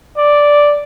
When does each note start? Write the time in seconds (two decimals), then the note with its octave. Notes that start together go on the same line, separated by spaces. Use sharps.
0.17 D5